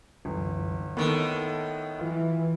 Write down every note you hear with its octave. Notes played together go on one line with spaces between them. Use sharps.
G1 C2 F#2 E3
A2 D#3 A#3 B3 A4 C6 C#6
E3 F4